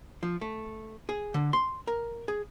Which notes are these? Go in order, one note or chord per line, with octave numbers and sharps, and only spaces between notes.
F3
A3
G#4
D3
C6
A#4
G#4